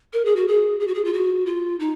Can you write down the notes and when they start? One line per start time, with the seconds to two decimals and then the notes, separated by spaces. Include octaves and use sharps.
0.13 A#4
0.25 G#4
0.36 F#4
0.48 G#4
0.80 G#4
0.87 F#4
0.95 G#4
1.04 F4
1.13 F#4
1.46 F4
1.80 D#4